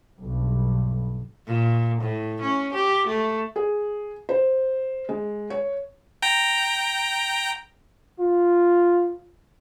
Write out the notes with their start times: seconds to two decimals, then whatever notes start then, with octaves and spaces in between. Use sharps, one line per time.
0.17 B1 G2
1.46 A#2
2.01 A2
2.42 C#4
2.73 G4
3.07 A3
3.56 G#4
4.29 C5
5.09 G#3
5.50 C#5
6.22 G5 A#5
8.19 F4